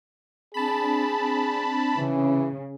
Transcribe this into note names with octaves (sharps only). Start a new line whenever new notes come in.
C4 D4 G#4 A5 B5
C#3 E3